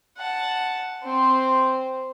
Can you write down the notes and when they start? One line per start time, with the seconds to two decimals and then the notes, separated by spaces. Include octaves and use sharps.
0.17 F#5 A5
1.03 C4 C5